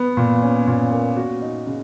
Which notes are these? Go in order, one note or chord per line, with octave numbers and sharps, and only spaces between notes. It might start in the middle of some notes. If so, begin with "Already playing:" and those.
Already playing: B3
A#2
C#4
A#2
A#3
F#4
D#4
C#3